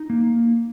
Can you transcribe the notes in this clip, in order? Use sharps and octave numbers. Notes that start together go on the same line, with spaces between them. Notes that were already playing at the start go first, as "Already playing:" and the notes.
Already playing: D#4
A#3